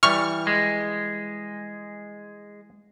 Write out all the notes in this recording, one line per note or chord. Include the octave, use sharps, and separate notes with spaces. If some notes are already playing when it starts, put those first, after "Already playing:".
E3 G3 C#6 F6
G#3